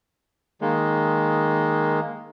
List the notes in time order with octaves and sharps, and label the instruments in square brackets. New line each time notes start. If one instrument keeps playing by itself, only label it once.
[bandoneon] D#3 G#3 A#3